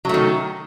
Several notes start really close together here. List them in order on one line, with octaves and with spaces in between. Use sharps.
F#3 A3 D#3